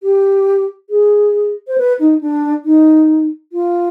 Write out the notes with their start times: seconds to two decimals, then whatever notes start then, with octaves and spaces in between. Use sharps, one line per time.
0.03 G4
0.90 G#4
1.68 C5
1.78 B4
1.99 D#4
2.21 D4
2.65 D#4
3.52 F4